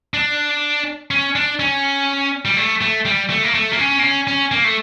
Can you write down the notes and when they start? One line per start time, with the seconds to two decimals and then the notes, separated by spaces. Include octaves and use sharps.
0.14 D4
1.11 C#4
1.36 D4
1.60 C#4
2.45 G3
2.57 A3
2.81 A3
3.05 G3
3.30 A3
3.44 A#3
3.54 A3
3.73 A#3
3.79 C#4
3.99 A#3
4.03 C#4
4.27 C#4
4.52 A#3
4.64 A3